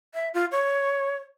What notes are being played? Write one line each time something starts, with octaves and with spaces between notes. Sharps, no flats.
E5
F4
C#5